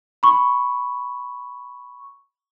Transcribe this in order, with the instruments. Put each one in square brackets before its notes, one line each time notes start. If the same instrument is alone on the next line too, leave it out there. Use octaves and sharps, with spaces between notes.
[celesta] B5 C#6